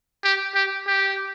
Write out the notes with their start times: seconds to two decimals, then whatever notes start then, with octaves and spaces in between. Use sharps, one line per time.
0.24 G4
0.55 G4
0.87 G4